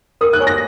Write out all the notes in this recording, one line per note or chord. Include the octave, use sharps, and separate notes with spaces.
A#4 D#6
F#6
C#5 G#5 C#6
A#6